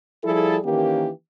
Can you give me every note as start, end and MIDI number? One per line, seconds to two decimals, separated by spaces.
0.24 0.58 53
0.24 0.58 55
0.24 0.58 64
0.24 0.58 68
0.24 0.58 69
0.65 1.10 51
0.65 1.10 52
0.65 1.10 58
0.65 1.10 61
0.65 1.10 67